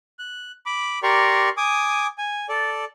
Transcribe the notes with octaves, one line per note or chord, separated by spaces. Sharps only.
F#6
B5 D6
G4 A#4 D5 A#5 C6 C#6
G#5 D6 D#6
G#5
A4 D5